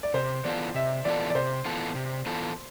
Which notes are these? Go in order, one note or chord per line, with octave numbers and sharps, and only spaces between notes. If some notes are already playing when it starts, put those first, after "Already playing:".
D5
C3 C5
E3 B3 F4 A4 D5
C3 E5
E3 B3 F4 A4 D5
D5
C3 C5
E3 B3 F4 A4
C3
E3 B3 F4 A4